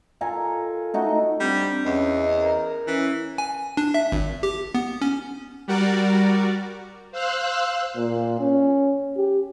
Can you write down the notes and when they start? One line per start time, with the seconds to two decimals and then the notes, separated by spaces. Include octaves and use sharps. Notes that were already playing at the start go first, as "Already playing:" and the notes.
0.21 F4 A4 A#4 G#5
0.94 A3 D#4 F#4
1.40 G3 C4 D4
1.85 E2 C#4 D#5
2.40 A#4
2.87 E3 C#4
3.38 G#5
3.77 D4
3.94 E5
4.12 G#1
4.43 G4
4.75 B3
5.02 C#4
5.68 G3 F#4 A#4 D5
7.12 C5 F5 E6 F#6
7.97 A#2
8.40 C#4
9.17 G4